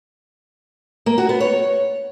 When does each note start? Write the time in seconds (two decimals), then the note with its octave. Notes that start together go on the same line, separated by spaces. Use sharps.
1.06 A#3
1.18 F#4
1.29 B3
1.40 C#5